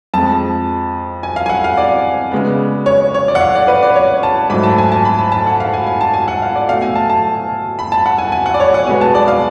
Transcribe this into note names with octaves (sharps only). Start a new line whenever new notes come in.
F2 F3 G#3 A5
G#5
F5
G#5
F#5
F5
D5
C#3 G#3 B3
C#5
C#5
D5
F#5
F5
D5
B4
D5
C#5
A5
G#2 F#3 A3 B5
A5
G#5
A5
B5
A5
A5
F#5
F5
G#5
G#5
A5
G#5
F#5
F5
D5
B2 A3 F5
G#5
A5
A5
B5
A5
F#5
G#5
G#5
F#5
D5
C#5
F#5
B2 G#3 B3 G#5
A5
D5
F5